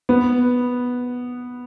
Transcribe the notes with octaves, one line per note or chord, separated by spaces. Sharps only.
B3